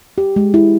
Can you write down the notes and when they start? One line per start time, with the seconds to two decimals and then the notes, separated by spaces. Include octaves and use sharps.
0.18 G4
0.36 G#3
0.54 E4